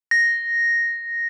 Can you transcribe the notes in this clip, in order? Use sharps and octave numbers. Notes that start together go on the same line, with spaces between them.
A#6